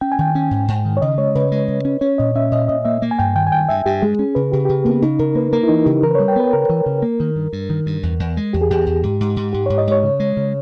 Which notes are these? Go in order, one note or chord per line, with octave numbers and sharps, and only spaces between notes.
C#4 G5
G#5
D#3 G5
C#4
G#2
G#2
D#3
C#5
C#3 D#5
G#3 C#5
C#3 B4
G#3
C#3
C#4
C#4 C#5
A#2 D#5
C#4 E5
A#2 D#5
A#2 D#5
A#3 E5
A#3
G#5
G2 G5
D#3 G5
G#5
G2 G5
G2 E5
G2 G4
G#3 G#4
C#4
C#3 B4
C#3 G4
C#3 G4
C#3 A#3 B3
C#3 D#4
C#3 A#4
A#3 B4
A#3 A#4
E4
E3 D#4
C#3 G4
E3 A#4
B4
G3 C#5
G5
B3 B4
C#3 A#4
E3
C#3
A#3
D#3
G2
G2
D#3
G2
E2
E2
G#3
E2 G4
G#4
E2 G4
E2
G#2
G#2
G#2
G#2 G4
G#2 C#5
D#5
G#2 C#5
C#3
G#3
C#3